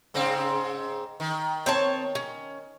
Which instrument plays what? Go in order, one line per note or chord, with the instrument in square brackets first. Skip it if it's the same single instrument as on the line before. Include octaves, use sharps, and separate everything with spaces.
[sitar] G#2 C#3 C4
D#3
[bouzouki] C4 C#5 A5
C#4